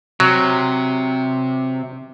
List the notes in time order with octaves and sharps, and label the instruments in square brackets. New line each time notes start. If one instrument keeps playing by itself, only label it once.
[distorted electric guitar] C3 [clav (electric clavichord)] F#3